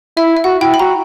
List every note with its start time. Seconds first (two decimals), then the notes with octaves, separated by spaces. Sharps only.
0.17 E4 E5
0.37 E5
0.44 F#4 F#5
0.61 E4 G5
0.74 B5
0.79 F#4 A#5